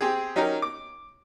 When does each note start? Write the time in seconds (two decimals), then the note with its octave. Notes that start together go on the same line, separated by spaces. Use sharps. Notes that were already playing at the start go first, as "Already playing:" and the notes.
0.01 C4 G4 G#4
0.36 F#3 C#4 D#4 G4 A#4
0.62 D6